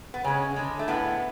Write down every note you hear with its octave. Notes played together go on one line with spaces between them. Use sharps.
B3
C#3 G#3 C#4
D3 G#3
A3
A2 G#3 B3